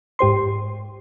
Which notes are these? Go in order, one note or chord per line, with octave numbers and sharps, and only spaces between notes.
G#2 G4 C5 C6